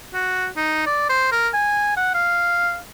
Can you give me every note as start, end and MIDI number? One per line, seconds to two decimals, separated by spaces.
0.14 0.48 66
0.57 0.85 63
0.86 1.06 74
1.09 1.27 72
1.32 1.48 70
1.54 1.96 80
1.97 2.11 78
2.14 2.77 77